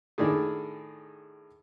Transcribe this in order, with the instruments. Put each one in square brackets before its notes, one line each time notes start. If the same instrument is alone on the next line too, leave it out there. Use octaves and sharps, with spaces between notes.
[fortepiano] A2 D#3 D4 G#4